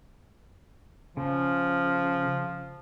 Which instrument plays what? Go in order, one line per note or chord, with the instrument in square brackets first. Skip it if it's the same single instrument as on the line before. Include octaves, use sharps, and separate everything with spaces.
[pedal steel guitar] C#3 [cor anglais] F3